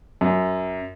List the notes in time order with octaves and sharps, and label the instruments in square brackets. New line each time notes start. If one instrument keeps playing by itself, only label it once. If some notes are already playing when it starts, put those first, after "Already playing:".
[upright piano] F#2